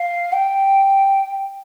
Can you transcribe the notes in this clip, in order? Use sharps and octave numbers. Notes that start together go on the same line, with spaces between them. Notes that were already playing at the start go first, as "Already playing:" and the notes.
Already playing: F5
G5